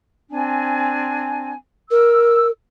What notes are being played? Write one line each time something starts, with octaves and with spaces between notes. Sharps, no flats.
C4 D4 G#5
A#4 E6